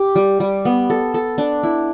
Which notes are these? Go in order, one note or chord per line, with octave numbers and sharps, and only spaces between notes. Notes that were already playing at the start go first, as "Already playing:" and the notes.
Already playing: G4
G3
G3
B3
A4
A4
D4
E4